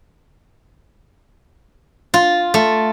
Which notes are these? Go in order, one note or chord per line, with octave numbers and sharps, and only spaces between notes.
F4
A3